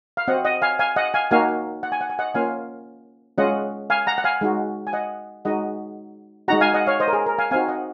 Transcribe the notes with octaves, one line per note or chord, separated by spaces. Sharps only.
F5
C4 F#4 D#5 F#5
D#5 F#5
F5 G#5
F5 G#5
D#5 F#5
F5 G#5
A#3 D#4 F#4 F5 G#5
F#5
G#5
F#5
G#5
D#5 F#5
A#3 C#4 F4 F5 G#5
G#3 C#4 F4 D#5 F#5
F5 G#5
F#5 A#5
F#5
F5 G#5
G#3 D#4 F#4
G#5
D#5 F#5
G#3 D#4 F#4 D#5 F#5
G#3 D#4 F#4 F#5 A#5
F5 G#5
D#5 F#5
C#5 F5
C5 D#5
A#4
G#4
A#4
F5 G#5
C4 D#4 F#4 F5 G#5
D#5 F#5